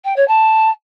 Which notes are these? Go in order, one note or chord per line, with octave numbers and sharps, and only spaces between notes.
G5
C#5
A5